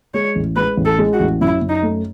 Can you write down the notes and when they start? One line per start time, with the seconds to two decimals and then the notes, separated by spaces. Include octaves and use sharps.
0.14 G#3 C#5
0.36 A1
0.56 G#3 B4
0.77 A1
0.85 A4
0.98 G#3
1.13 F#4
1.20 A1
1.41 F#2 E4
1.62 F#2
1.69 D#4
1.83 A3